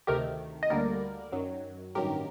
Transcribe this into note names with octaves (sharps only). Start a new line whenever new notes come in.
D2 C3 D#3 A3 G4 A#4
D#5
D2 D3 G3 A#3 A#4 D5
F#2 D#3 F#3
A1 G2 D#3 F#3 G4 A#4